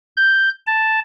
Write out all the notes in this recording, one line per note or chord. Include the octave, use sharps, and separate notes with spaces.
G6
A5